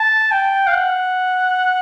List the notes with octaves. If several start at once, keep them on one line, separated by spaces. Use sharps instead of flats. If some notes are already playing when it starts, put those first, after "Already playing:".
Already playing: A5
G5
F5
F#5